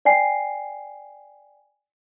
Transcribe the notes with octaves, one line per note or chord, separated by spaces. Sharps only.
D5 G5 G#5 C7